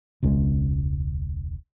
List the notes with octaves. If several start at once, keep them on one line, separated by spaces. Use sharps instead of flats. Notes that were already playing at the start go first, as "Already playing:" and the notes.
E1 C#2 C#3 G#3